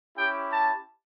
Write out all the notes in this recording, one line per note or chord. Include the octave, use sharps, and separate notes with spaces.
C#4 E4 G4 G5
A5